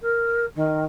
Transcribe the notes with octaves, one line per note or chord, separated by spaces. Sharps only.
A#4
D#3